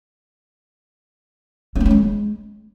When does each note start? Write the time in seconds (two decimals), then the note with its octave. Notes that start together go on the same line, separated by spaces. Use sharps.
1.75 C#4
1.81 A#3
1.86 C#4
1.91 G#3